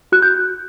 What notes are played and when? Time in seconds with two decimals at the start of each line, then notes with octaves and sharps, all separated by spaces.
0.12 F#4 F#6
0.22 G6